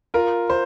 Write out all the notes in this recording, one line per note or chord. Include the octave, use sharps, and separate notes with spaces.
F4 A#4
C5